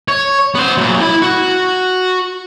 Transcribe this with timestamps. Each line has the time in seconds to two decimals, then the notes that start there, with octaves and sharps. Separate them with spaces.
0.08 C#5
0.55 B3 C5
0.78 A#2 F#3
1.01 E4 B5
1.22 F#4